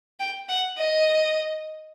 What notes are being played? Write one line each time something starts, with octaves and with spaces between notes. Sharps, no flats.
G5
F#5
D#5